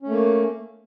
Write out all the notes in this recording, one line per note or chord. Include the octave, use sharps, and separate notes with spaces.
A3 A#3 C#4